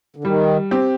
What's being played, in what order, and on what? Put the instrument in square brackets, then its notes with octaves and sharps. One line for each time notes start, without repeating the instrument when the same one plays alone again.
[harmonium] D3
[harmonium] D#3 [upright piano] G3
[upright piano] C4 G4